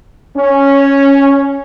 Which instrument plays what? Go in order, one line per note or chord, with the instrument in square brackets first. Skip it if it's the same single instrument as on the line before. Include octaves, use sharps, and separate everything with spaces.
[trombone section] C#4